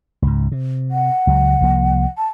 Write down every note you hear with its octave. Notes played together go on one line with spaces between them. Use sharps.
C#2 G#2
C3
F#5
C#2 F#3
C2 F3 A#3
A5